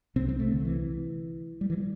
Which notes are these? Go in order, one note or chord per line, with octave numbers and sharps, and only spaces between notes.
C2 C3 C4
C4
A3
D3
G3
E3
G3
E3
G3